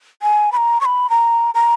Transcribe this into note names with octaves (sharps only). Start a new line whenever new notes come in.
G#5
B5
A#5
C#6
B5
A#5
A#5